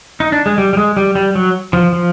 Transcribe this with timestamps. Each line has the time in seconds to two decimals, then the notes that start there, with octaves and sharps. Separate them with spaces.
0.20 D#4
0.32 D4
0.46 G#3
0.58 G3
0.73 G3
0.77 G#3
0.97 G3
1.15 G3
1.35 F#3
1.73 F3
1.93 F3